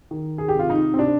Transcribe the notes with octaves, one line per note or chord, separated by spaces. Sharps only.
D#3
G#4
G4
C3 F4
D#4
C4
C3 D4